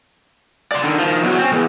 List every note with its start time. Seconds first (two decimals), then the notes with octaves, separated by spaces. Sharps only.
0.72 D5 C6
0.84 D3 D#3
0.99 D#3 F3
1.23 E2 F#3
1.39 C4 C#4
1.52 B1 E2